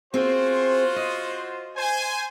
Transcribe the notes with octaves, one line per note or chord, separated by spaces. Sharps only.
C4 F4 F#4 G#4 C5
D#5
C5 G#5